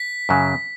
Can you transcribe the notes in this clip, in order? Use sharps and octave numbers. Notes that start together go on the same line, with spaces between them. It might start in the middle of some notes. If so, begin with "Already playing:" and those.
Already playing: B6
F#2 C#3 F#3